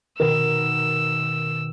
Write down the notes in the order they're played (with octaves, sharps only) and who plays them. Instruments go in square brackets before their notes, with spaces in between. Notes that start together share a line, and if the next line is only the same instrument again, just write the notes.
[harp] B2 D#3 [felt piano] A#4 [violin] E6